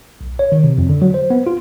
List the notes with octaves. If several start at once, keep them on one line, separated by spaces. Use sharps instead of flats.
B1
C#5
D#3
C3
F2
D3
F#3
C5
B3
F4